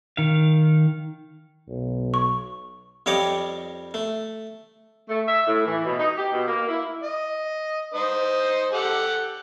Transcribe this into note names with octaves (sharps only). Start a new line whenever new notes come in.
D#3 F5
B1
C#6
F2 G3 C#5 D#5 G5 D6
A3
A3
E5
A2
E3
B2
D#4
G4
B2
A#3
E4
D#5
D#4 C5 D#6
G4 A4 F#5